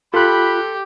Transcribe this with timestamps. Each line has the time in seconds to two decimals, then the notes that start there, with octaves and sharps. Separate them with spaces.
0.14 F4 G4 A4 B5 C6 F#6